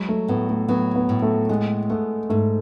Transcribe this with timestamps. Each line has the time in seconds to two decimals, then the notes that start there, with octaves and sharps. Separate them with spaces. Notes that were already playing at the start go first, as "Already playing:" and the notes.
Already playing: F#3 G#3
0.09 A3
0.28 A2 B3
0.49 A3
0.69 F#3 B3
0.95 B3
1.09 A2
1.22 A3
1.49 G#3 B3
1.90 A3 B3
2.30 G#2 A3